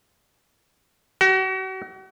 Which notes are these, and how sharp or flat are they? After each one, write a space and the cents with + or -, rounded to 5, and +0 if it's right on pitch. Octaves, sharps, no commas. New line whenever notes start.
F#4 +40